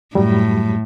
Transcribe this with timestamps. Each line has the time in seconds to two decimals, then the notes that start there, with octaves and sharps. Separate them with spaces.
0.15 F#2 A2 F#3 G3